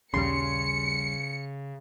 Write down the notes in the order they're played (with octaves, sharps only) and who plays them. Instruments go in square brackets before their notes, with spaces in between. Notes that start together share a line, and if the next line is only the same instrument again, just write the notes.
[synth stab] A#1 D#2 G3 [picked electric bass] C#3 [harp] C6 [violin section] C#7